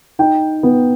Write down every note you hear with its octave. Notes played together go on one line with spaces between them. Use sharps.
D#4 G5
B3